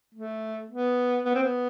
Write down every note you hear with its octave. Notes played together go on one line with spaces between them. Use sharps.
A3
B3
B3
C4
B3